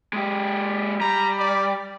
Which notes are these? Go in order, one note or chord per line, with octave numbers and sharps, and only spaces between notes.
G#3 G4
G3 A#5
D5